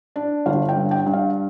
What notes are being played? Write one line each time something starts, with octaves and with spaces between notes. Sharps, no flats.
D4
G1 F5
G5
G2
G5
G2
F5